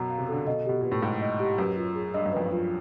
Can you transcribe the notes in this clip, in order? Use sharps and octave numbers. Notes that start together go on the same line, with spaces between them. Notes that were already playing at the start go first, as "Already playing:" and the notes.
Already playing: F#2 B2 A#5
F5
C3
D3 A4
B2 D#5
B2 G4
A#2 B4
A2
G#2 G5
D#5
G4
F#2 B4
F4
G#4
G2 D#5
F#2
F2 B4
F#2 F4